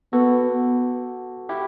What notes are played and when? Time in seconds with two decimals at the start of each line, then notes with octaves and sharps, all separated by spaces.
0.13 B3 F#4 A4
1.49 E4 G4